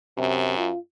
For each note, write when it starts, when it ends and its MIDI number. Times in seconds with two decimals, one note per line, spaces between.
0.18 0.69 42
0.18 0.56 48
0.58 0.79 65